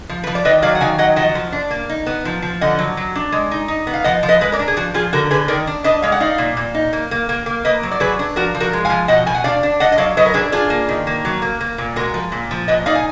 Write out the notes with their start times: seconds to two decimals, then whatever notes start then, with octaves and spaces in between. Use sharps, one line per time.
0.09 F3
0.24 F3 B4
0.35 D5
0.45 D#3 B4 D#5
0.62 F#3 D5 F5
0.75 F#5
0.81 D#3 F5 G#5
0.98 F#3 D#5 F#5
1.16 F3 D#5 F#5
1.35 F3
1.52 D4
1.71 A#3
1.89 D#4
2.06 B3
2.25 F3
2.42 F3
2.61 D3 D#5 F#5
2.79 F#3
2.97 F#3
3.16 D4
3.32 G#3
3.51 D#4
3.68 D#4
3.87 B3
3.94 F5
4.04 F3 D#5 F#5
4.23 F3
4.28 B4 D#5
4.41 G#3 B4
4.52 A#4 D5
4.59 D4
4.68 G#4
4.77 F3 F#4
4.94 F3 F4 G#4
5.13 D3 F#4 A#4
5.31 D3 G#4 B4
5.48 D#3 A#4 D5
5.67 D4
5.84 D4 B4 D#5
6.02 G#3 F5
6.12 F#5
6.20 D#4 D5 F5
6.38 A#2
6.57 A#2
6.75 D#4
6.93 A#3
7.11 A#3
7.29 A#3
7.46 A#3
7.65 A#3 B4 D#5
7.83 F#3
7.91 D5
8.00 F#3 G#4 B4
8.19 D4
8.36 F3 F#4 A#4
8.55 F3
8.60 F#4 A#4
8.73 G#3
8.85 F5 G#5
8.90 F3
9.08 B2 D#5 F#5
9.26 B2 G#5
9.35 F#5
9.44 D4 D5 F5
9.63 D4
9.80 D4 D#5 F#5
9.92 D#5
9.98 F#3 D5 F5
10.17 F#3 B4 D#5
10.26 A#4
10.34 D4 G#4 B4
10.52 D4 F4 G#4
10.70 A#3
10.89 D#3
11.07 A#3
11.25 F#3
11.42 A#3
11.60 A#3
11.78 A#2
11.96 G#3 F#4 A#4
12.14 F3
12.32 A#2
12.51 F3
12.68 A#2 B4 D#5
12.86 D#4 D5 F5
12.95 G#5